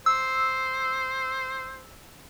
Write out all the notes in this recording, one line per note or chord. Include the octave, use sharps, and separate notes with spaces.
C5 E6